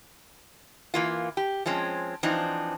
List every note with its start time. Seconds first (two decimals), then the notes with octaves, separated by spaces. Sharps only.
0.94 E3 A#3 F4
1.37 G4
1.66 F3 G#3 C4 C#4
2.23 E3 F3 C4 D4 D#4